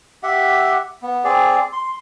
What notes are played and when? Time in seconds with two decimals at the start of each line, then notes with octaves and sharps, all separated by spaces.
0.23 G4 E5 F#5
1.02 B3
1.24 C4 G#4 D5
1.73 C6